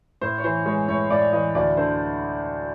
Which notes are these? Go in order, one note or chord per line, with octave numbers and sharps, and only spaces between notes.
A2 C5
C#5
E3 C5
G#3 C#5
A2 C#5
A2 D5
E3 D#5
D2 D5
D3 C5